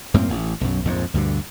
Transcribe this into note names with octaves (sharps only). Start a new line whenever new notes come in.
F#2 A2 A#3 C4
A1
B1 F#2
A#1 F2 G#2
D2 G2 B2 D3